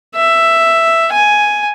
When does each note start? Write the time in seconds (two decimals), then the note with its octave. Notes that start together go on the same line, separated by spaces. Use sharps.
0.16 E5
1.12 G#5